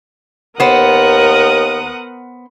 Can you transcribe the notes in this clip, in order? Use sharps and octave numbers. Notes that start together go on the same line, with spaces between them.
D#2 B3 A#4 C5 F#5 D#6